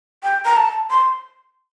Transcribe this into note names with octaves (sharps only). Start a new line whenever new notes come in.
G5
A#5
A5
C6